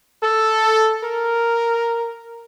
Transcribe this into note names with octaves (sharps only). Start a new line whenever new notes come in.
A4
A#4